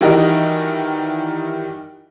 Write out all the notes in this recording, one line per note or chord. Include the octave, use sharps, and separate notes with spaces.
D#3 E3 G3 F#4 A#4 D#5